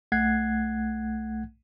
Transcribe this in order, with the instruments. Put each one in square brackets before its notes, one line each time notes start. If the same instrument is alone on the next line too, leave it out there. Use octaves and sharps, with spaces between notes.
[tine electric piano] B1 A3 F#5 F#6 G#6 C7